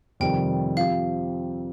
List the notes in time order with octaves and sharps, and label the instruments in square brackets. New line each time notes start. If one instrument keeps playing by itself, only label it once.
[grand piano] F2 C3 D#3 G3 [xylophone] G5
[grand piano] F3 C4 G4 [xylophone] F5